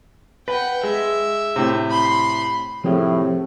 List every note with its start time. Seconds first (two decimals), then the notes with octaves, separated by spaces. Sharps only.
0.48 B4 F#5 G5
0.83 G#3 E5
1.56 A2 C3
1.90 B5 C6
2.84 A2 C3 F3 G#4